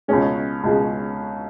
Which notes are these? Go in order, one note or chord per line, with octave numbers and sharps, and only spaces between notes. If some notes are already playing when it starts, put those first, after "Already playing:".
C#2 B2 G#3 C#4
C#2 B2 G#3